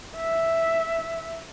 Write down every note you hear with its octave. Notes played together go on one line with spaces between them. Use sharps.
E5